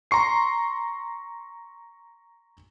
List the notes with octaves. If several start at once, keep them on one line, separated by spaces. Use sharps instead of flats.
A#5 C6 C#6 C7